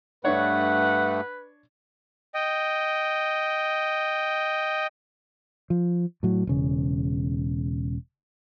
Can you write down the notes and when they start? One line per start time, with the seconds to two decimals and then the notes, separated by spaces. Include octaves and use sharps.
0.25 G2 A3 D4 B4 C#5 F#5
2.34 D#5 G5
5.70 F3
6.23 A2 F#3
6.47 E1 C#3